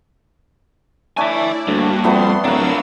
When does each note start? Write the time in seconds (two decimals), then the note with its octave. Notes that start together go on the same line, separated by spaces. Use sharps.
1.17 A3 D4 E4 C#5 D5 E5 G#5
1.67 D2 G2 A#3 F#4
2.04 F2 G3 A3 B3 C6
2.44 D1 F#3 D4 F4 A#4 F5 F#5 E6